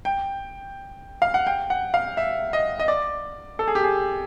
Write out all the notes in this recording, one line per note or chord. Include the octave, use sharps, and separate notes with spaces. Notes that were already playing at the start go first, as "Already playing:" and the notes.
G5
F5
F#5
G5
F#5
F5
E5
D#5
D#5
D5
A4
G#4
G4
G#4